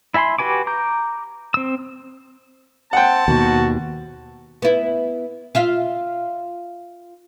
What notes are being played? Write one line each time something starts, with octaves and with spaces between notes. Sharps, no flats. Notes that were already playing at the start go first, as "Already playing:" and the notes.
E4 E5 G#5 B5 C6
F#4 G4 B4 G#5 D6
A#5 D6 G6
C4 E6
C4 F#5 G5 A5
D#2 B2 F#4
B3 E4
F4 E5 F5